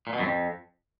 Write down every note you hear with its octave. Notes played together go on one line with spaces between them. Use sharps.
A#2
B2
F#2
F2